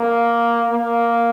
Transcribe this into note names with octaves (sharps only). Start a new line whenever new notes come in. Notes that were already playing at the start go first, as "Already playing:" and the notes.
Already playing: A#3
A#3